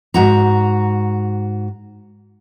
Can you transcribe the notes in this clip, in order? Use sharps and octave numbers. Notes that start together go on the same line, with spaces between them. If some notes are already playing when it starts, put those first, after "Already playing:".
G#2 F#4 A#5